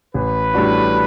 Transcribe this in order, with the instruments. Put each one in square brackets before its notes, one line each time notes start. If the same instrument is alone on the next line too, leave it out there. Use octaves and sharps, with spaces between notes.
[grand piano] A1 [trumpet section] B4
[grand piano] A2 G3 D4 F#4